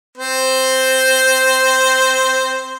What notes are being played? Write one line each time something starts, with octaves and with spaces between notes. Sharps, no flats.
C4 C5